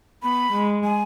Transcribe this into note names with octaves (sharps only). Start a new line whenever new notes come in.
B3 B5
G#3
G#5